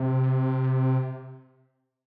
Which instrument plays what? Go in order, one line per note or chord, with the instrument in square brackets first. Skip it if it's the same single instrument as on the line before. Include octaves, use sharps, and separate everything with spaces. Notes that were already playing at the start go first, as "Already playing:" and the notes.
Already playing: [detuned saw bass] C3